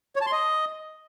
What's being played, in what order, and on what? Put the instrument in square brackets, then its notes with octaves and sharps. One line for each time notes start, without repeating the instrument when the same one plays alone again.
[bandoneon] C#5
A5
C6
D#5